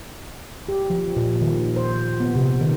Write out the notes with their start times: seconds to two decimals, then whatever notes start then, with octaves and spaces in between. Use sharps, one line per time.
0.69 G4
0.90 F3
1.16 A#2
1.42 D#3
1.76 C5
2.20 B3
2.35 C3
2.61 D#3